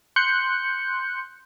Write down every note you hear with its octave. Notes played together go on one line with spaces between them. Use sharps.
C6 F#6 G6 C#7